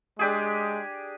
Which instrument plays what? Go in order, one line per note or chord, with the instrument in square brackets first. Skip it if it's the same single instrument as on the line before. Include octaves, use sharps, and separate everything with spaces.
[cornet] G#3 [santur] D4 G4 G#4